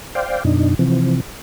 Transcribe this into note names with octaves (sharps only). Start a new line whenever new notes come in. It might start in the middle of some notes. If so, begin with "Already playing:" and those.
C5 D5 F5 G5
F#2 B2 D4 D#4
C3 E3 F3 C4